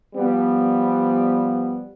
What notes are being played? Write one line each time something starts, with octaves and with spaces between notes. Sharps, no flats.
F3 G3 B3